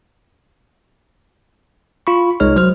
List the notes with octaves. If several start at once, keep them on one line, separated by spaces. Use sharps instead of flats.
F4 B5 C#6
C2 G#3 D#4 C#5 F6
F#3 C5 F6